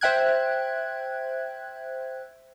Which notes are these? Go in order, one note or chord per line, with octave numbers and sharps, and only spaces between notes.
C5 E5 G5 F#6 G#6